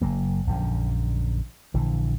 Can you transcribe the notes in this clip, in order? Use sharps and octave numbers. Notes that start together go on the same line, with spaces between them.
F#1 F#3 A#3
A#1 F#2 D3
A#1 D3 E3